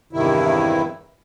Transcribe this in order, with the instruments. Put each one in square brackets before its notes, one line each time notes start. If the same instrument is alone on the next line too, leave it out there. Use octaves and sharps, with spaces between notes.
[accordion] E2 G2 C3 D#3 E4